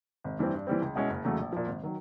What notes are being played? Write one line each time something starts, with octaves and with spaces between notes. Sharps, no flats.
G#1
G2 E3 G3 C4
G2
E3 G3 C4
C#2
B2 G#3 C#4 E4
F#1
E2 C#3 F#3 A3
A#1
A#2 F3
G#1
D#3 F#3